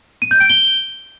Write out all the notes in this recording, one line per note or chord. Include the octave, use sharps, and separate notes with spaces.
D#7
G6
D7
G7